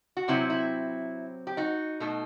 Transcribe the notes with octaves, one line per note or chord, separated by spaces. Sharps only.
F#4
C3 F#3 C4 E4
E4
G4
D#4 F#4
B2 A3 D#4